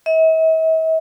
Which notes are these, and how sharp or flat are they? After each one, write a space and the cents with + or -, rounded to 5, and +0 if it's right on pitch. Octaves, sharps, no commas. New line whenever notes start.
E5 -45